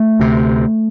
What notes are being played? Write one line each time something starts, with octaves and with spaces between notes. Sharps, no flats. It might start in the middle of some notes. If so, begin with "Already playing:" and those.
Already playing: A3
D2 C3